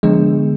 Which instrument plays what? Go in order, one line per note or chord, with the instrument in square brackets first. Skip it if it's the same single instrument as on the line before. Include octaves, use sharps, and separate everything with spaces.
[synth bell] D3 F3 B3 D4 [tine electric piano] G#3